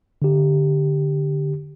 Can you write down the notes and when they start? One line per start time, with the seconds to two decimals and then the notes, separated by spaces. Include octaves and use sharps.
0.22 D3 G4